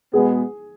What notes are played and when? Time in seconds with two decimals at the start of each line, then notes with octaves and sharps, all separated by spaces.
0.13 B2 G#3 B3 G#4